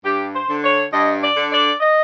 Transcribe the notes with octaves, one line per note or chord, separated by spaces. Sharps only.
G2 G4
C5
D3
C#5
G2 D#5
D5
D3
D5
D#5